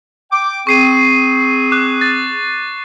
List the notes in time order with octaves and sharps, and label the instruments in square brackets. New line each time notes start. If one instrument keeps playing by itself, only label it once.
[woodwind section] G5 D6
[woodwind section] C4 G#4 [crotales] C#6 C7 D#7
[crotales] D6 F#6
A6